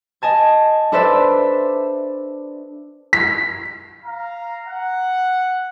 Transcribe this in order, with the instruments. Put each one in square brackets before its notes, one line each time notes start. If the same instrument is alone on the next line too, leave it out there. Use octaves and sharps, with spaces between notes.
[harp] D#5 G#5 A5 G#6
D4 A4 B4 C5 D5 E5
[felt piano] B6
[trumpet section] F5 A#5
F#5